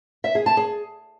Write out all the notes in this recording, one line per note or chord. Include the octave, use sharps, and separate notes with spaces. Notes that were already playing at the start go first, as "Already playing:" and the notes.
E5
G#4
A5
G#4